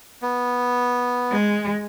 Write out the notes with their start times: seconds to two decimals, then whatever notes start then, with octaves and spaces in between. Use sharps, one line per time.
0.22 B3
1.31 G#3